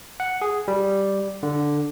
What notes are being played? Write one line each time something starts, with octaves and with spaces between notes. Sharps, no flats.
F#5
G#4
G3
D3